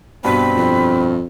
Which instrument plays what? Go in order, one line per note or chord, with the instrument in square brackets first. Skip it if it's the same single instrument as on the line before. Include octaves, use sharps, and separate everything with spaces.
[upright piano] G2 B2 [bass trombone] C4 [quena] B5
[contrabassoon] F2